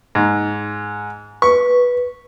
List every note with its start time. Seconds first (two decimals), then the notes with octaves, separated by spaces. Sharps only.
0.15 G#2
1.42 B4 C#6